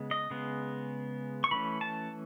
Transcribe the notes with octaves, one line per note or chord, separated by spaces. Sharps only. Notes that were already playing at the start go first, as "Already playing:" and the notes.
Already playing: C#3 G#3 B3
D#5
C#3 G#3 B3
C#6
E3 A3 C#4 B5
A5